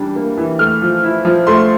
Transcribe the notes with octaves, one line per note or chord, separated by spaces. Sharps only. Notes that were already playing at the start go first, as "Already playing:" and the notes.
Already playing: E3 G3 D4
A#3
E3
A3 F6
F3
E4
F3
A3 C6